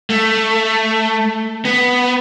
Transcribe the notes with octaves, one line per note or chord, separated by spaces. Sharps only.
A3
B3